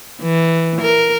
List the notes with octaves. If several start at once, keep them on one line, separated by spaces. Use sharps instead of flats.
E3
A#4